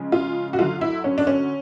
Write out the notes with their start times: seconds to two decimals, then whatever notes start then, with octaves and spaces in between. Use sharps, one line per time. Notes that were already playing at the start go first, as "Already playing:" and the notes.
Already playing: C#3 F3 G#3
0.12 F4
0.53 F#4
0.58 D3 F#3 A3 F4
0.81 E4
1.04 C#4
1.18 D4
1.27 C#4